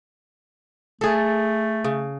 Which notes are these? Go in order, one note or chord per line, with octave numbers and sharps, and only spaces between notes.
A3 G#4 A4
C#3